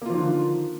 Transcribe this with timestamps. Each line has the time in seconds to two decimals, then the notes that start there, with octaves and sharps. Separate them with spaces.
0.02 A#3
0.06 F4
0.10 F3
0.14 D#3
0.18 D3